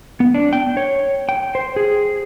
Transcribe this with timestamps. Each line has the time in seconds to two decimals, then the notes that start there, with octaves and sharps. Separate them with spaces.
0.20 B3
0.35 D4
0.53 G5
0.77 C#5
1.29 G5
1.55 C5
1.76 G#4